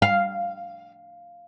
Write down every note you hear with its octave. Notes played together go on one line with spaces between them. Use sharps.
F5